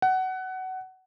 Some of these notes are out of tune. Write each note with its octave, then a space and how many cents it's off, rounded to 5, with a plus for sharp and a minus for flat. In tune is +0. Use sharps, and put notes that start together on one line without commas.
F#5 +20